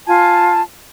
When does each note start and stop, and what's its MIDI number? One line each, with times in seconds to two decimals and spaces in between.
0.07 0.61 65
0.07 0.61 80
0.07 0.61 81